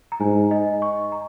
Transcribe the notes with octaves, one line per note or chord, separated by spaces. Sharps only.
A#5
G#2 G#5
D#5
C#6
A#5